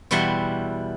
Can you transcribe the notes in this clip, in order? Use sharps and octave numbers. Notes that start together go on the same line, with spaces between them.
E2 B2 G3 E4 F#5 C6